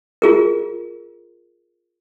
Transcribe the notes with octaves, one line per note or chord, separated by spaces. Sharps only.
F4 G#4 A#4